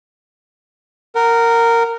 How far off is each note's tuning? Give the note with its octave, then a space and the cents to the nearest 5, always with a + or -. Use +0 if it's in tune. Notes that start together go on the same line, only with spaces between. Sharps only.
A#4 -10 F#5 +15